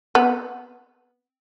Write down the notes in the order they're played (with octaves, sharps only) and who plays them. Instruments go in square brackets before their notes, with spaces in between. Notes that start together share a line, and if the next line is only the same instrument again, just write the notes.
[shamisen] B3